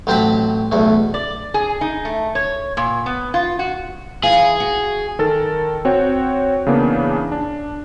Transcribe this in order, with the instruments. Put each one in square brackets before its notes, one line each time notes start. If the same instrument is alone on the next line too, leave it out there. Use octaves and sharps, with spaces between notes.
[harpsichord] A1 F#3 C4 C5 A5 B5
B1 E2 A3
[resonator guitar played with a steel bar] D5
G#4
D#4
A3
C#5
A#2
B3
F4
F#4
[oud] E3 E4 F4 [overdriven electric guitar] G#4
[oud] F#4
[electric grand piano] D#3 A4 A#4 A6
C4 F#4 C#5 G5
C#3 E3 A#3 B3 D4
D4